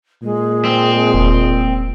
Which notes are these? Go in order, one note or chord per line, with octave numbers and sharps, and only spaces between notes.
A#2 G#3
C4
E1